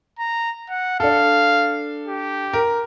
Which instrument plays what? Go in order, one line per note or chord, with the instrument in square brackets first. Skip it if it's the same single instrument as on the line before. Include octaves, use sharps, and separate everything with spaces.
[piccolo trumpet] A#5
F#5
[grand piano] D4 A4 [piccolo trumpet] F5
[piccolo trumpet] G4
[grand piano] A#4